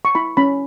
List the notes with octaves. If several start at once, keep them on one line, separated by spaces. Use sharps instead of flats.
C#6
E4 B5
C#4 B5